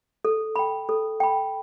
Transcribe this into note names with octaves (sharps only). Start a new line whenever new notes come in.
A4
G5 B5
A4
G5 B5